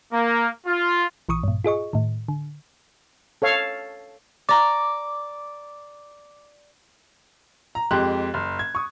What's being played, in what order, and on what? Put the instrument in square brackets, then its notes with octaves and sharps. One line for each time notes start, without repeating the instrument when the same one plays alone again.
[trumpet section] A#3
F4
[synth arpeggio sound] A#1 E3 C#6 D#6
G2 A#2
F4 G#4 D#5 C#6
A2 D#3
D3
[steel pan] A4 C#5 F5
[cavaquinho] D5 A#5 [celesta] D6
[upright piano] A#5
F2 G#3 G4 C6 F#6
F#1
G#6
C#6 D#6